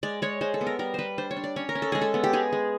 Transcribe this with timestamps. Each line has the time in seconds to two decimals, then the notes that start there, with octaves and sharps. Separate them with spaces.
0.03 G#3 D5
0.22 G#3 C#5
0.41 G#3 C5
0.54 A4
0.61 B3
0.67 A#4
0.79 G3 A#4
0.94 G3 B4 C5
1.18 D4 C5
1.31 C#5
1.37 D4
1.44 D5
1.56 C#4 C#5
1.69 A#4
1.75 C#4
1.82 A4
1.92 G#3 G#4
2.01 A4
2.14 B3
2.24 G4
2.33 G#3 G#4
2.53 G#3